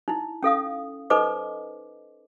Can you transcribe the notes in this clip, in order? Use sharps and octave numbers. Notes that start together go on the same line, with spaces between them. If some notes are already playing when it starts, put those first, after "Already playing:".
D#4 E4
C#4 A4 F5 D#6
D#4 A4 B4 C5 D#5 D6